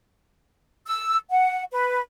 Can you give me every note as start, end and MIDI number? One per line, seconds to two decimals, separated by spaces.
0.87 1.16 88
1.30 1.63 78
1.72 2.01 71